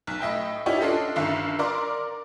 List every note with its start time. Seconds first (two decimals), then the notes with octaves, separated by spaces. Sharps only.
0.07 B1
0.20 A2 D#5 E5 G5
0.66 C#4 D#4 E4 G4 C#5 D5
0.81 D4 F4 A4 D#5
1.16 G1 G2 D#3 E5 F5
1.59 A#4 D5 C6 D6